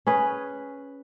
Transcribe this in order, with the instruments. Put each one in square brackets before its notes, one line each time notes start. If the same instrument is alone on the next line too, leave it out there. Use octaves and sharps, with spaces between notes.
[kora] C#4 G#4 B4